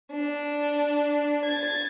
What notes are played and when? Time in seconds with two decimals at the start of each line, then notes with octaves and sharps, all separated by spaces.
0.12 D4
1.45 G#6 A6